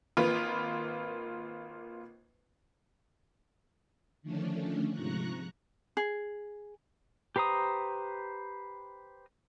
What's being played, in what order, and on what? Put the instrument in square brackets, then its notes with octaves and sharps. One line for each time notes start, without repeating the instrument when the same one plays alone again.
[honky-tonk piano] G#1 A#3 F4 B4
[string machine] D3 D#3 F3 A3 C#4 D4
G#2 C3 F3 A#5 C#6 F#6
[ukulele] G#4
[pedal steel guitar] G4 B4 C5 A#5 D#6